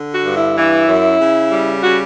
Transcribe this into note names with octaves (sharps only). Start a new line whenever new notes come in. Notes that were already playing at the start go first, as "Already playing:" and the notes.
Already playing: D3
F#4
G2
E4
E3 E4
F#2
C#3
G3
C#3 F#4